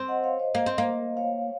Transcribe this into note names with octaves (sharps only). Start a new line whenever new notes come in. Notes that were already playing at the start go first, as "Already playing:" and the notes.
Already playing: C4
D#5 F#5
C#5 F5
C5 D#5
A#3
C4
A#3
C#5 F5